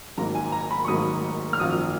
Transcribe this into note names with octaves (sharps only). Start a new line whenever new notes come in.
G#1 G#2 F#3 A#3 A#5
G#5
A#5
B5
C#6
G#1 G#2 F#3 A#3 D#6
F6
G#1 F#2 F3 A#3 D#6